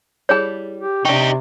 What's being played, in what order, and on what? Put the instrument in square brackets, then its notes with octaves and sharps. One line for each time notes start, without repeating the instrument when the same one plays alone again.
[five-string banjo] G3 E4 A5 [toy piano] G#4 C#5
[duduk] G4
[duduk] C3 [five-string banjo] D4 G5 [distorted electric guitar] D#4 G4 [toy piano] C#6